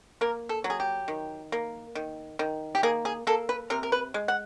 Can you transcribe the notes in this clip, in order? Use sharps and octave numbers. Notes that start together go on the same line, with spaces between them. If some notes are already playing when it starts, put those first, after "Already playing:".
A#3 A#4
A4
F#3
G#4
G4
D#3
A#3
D#3
D#3
G4
A#3 G#4
G#4
A#3 A4
B4
C3 A#4
A#4
B4
G#3
F#5